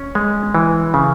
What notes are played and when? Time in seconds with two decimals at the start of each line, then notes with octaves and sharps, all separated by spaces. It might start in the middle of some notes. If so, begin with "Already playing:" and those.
Already playing: C#4
0.15 G#3
0.55 E3
0.94 C#3